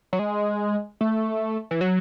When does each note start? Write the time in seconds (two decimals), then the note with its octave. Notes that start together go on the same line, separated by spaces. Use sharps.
0.13 F#3
0.19 G#3
1.01 A3
1.71 E3
1.81 F#3